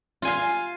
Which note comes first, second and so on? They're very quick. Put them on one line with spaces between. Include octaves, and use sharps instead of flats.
F4 G#5 F5